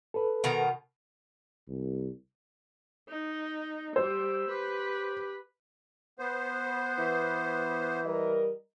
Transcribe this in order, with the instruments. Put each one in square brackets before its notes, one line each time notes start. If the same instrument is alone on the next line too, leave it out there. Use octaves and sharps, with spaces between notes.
[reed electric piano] A4 B4
[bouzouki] B2 D#3 A#5
[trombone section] C2
[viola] D#4
[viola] G3 [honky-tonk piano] C5 [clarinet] E6
[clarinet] G4 [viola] B4
[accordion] B3 C5
[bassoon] E3
[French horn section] G3 A#4 D#5